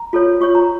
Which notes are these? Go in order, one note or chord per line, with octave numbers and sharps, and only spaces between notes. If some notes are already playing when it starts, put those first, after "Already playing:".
Already playing: A#5
F4 A4 C#5
F4 C#5 C#6
A#5